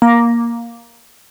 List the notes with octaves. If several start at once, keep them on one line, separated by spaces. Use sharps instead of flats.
A#3